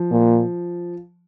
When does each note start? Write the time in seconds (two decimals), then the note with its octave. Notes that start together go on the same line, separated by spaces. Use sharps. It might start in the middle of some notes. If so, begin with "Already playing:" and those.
Already playing: F3
0.11 A#2